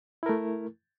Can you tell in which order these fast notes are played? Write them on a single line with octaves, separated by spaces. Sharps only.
E4 A#4 A3